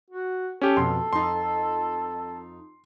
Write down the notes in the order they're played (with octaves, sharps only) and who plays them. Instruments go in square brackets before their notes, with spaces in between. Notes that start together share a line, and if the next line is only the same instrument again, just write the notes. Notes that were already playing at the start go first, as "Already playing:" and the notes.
[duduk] F#4
[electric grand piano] C#4 G4 [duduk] A4
[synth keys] F2 B2 [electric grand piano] C6
[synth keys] F2 D#4 [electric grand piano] C6